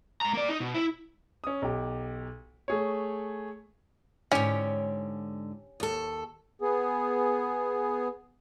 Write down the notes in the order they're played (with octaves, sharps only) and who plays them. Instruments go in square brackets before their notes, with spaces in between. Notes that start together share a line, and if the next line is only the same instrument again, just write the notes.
[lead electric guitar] G#2 A#5
A#3 D5
D#4
B2
E4
[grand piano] C#4 D#6
B1 G4
A3 G#4 C#5
[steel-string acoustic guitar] G#2 D3 [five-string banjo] C#4 G4 C#5
[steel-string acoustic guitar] D#2 A4
[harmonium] B3 G#4